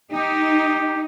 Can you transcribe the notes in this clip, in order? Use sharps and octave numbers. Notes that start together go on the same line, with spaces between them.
D#4 G4